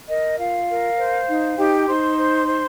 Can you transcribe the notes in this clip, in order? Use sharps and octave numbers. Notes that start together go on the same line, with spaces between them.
A#4 D#5
F4 F5
A#4
C5
D#4
D#4 G4 G5
D#4 C5 C6
C5
C5